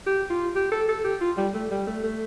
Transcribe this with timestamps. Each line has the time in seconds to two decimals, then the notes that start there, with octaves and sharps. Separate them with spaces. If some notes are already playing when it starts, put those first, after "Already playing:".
0.07 G4
0.30 F4
0.56 G4
0.72 A4
0.89 A4
1.05 G4
1.21 F4
1.38 G3
1.54 A3
1.71 G3
1.87 A3
2.04 A3